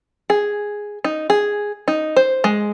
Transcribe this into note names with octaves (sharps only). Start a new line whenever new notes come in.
G#4
D#4
G#4
D#4
C5
G#3